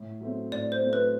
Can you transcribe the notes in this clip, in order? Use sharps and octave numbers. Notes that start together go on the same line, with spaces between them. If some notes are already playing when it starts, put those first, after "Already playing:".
Already playing: A2
F#3 A3 C4
A2 D5
C5
F#3 A3 C4
B4